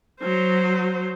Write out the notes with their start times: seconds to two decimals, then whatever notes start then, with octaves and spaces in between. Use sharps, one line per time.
0.20 F#3 C5